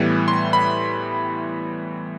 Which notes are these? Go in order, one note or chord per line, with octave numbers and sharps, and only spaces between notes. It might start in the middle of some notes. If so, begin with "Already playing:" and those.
Already playing: A2 E3 G3 B3
C6
B5